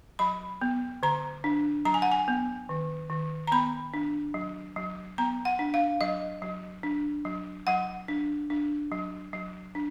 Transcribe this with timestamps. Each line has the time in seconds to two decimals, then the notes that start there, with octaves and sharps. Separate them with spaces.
0.19 F#3 B5
0.61 B3
1.03 D3 A#5
1.44 D4
1.85 F#3 A#5
1.94 G#5
2.02 F#5
2.12 G#5
2.28 B3
2.69 D#3
3.10 D#3
3.47 A#5
3.52 B3 B5
3.94 D4
4.34 F#3
4.76 F#3
5.18 B3 A#5
5.45 F#5
5.59 D4
5.74 F5
6.01 F#3 D#5
6.42 F#3
6.83 D4
7.25 F#3
7.67 F#3 F#5
8.08 D4
8.50 D4
8.92 F#3
9.33 F#3
9.75 D4